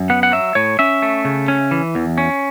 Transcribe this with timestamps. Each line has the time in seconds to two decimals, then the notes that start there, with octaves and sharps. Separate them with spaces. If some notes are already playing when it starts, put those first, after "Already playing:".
Already playing: F#2
0.10 B3 F#5
0.23 F#5
0.32 F#3 E5
0.55 A2 C#5
0.79 C#4 E5
1.02 A3
1.25 C#3
1.48 C#4
1.71 E3
1.95 E2
2.18 C#4